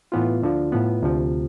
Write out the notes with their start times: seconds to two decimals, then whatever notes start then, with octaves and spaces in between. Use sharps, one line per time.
0.12 A2 E3 B3 F4
0.42 D2 D3 F3
0.72 A2 F3 B3
1.02 D2 C3 F3